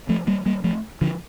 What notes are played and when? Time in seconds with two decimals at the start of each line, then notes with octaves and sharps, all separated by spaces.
0.09 F3 A3
0.27 G3 A#3
0.46 G3 A#3
0.64 F3 A3
1.01 D3 F3